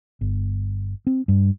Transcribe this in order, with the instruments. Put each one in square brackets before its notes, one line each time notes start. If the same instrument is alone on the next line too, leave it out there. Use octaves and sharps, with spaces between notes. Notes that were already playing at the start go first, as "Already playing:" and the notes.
[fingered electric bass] G1
C4
G2